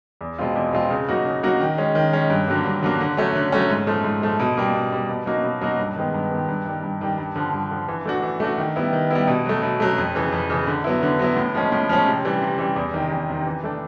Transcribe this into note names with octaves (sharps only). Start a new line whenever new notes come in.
E2
B2 G#3 C4 F4
E2
B2 G#3 C4 F4
C#3
F#3 A#3 D#4 F#4
C#3
F#3 A#3 D#4 F#4
D#3
G#3 C#4
D#3
G#3 C#4
G2
D3 F#3 A#3
G2
D3 F#3 A#3
D3
F#3 A3 C#4
D3
F#3 A3 C#4
G#2
F3 A3
G#2
F3 A3
B2
G3 A#3
B2
G3 A#3
B2
F#3 A#3 D#4 F#4
B2
F#3 A#3 D#4 F#4
G2
D#3 G#3 B3
G2
D#3 G#3 B3
G2
D#3 G3
G2
D#3 G3
G2
D3 F3
G2
D3 F3
E3
A3 D4 F#4
E3
A3 D4 F#4
D#3
G3 B3 E4
D#3
G3 B3 E4
B2
F#3 A3
B2
F#3 A3
F2
C#3 E3
F2
C#3 E3
D3
F#3 B3 E4
D3
F#3 B3 E4
A2
F3 G#3 C#4
A2
F3 G#3 C#4
C3
E3 G3
C3
E3 G3
E2
C3 D#3
E2
C3 D#3
E3
A3 D4